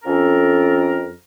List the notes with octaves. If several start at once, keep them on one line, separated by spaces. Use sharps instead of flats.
F2 C#4 A4 A#4